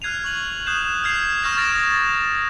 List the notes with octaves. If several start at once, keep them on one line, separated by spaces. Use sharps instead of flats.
F6 F#6 G#6 C7 D#7 F7
C#6 F#7
D#6 F#6 G6 C7 E7
F6 F#6 G#6 C7 F7
C#6 F6 G6 A#6 E7
D#6 F6 A6 A#6 D7 F7